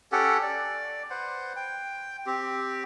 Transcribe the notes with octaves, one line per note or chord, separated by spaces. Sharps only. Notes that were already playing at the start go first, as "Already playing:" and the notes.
C#4 G4 A4 F#5
D5
B4 C5 F#5
G5
C4 G4